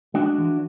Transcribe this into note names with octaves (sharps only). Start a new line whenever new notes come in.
G#3 D4 F#4
E3